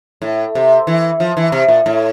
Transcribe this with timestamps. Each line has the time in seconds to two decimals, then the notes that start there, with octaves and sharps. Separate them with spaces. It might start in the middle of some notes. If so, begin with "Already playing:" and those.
0.22 A2
0.55 C3
0.87 E3
1.20 F3
1.37 E3
1.52 C3
1.68 A#2
1.86 A2